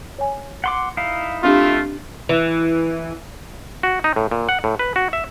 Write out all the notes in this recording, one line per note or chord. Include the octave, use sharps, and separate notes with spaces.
C#5 G#5
F#5 C6 D6
D#4 E4 F5
A3 C4 D4 F4 G4
E3
F#4
D#4
A2
A#2
F#5
A2
B4
F#4
E5